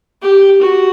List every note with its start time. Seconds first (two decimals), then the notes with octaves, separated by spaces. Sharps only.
0.22 G4
0.61 F#4